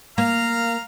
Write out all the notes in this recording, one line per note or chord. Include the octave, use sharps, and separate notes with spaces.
A#3 F5 A#5